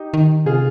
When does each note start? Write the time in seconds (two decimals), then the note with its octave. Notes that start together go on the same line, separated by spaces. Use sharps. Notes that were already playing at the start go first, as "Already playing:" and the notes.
Already playing: D#4 G4
0.14 D#3
0.46 C3 F4 G#4